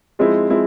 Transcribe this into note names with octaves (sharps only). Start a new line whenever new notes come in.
F3 G#3 C4 E4
F3 G#3 C4 E4